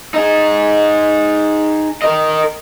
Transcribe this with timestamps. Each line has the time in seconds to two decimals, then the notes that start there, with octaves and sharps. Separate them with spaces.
0.14 D#4 G#4
2.02 A#4 D#5